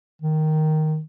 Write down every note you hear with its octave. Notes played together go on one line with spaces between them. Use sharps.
D#3